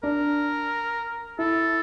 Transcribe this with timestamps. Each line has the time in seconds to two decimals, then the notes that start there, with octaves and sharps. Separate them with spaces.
0.03 D4 A#4
1.39 E4 A4